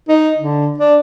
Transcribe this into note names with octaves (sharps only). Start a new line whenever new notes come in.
D#4
D3
D4